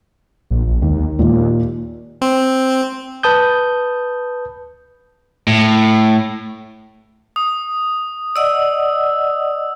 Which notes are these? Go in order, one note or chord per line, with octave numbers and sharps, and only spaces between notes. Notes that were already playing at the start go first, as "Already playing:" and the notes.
A#1
A#1
D#2 D#3
D#2 A#2
C4
B4 A5 D#6 G6
A2
D#6
D5 D#5 F#5 E6